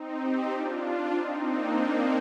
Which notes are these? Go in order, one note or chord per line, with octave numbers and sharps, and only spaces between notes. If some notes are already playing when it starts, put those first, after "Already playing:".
Already playing: C4 D#4
D#4 G4
D4 F4
C4 D#4
A#3 D4